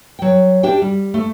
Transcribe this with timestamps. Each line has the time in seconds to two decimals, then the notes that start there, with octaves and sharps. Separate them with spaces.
0.19 F#3 G5
0.63 D4 G4 E5 G5
0.82 G3
1.14 A3